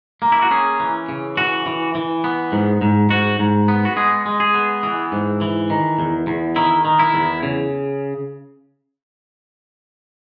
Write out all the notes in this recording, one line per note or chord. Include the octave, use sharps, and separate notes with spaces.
A#3
E4
F#4
C#4 G#4
E3
C#3
E3 F#4
E3
E3
B3
G#2
G#2
G#2 F#4
G#2
B3
F#4
G#3 G#4
G#3
G#4
B3
E3
G#2
E3
D#3
E2
E2
D#3 E4
D#3
E4
E2
C#3